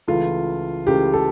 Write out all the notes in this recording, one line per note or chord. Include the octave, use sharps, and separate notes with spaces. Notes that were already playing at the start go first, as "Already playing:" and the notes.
C#2 C#3 E3 A3 F4
C#2 C#3 E3 A3 G4
A4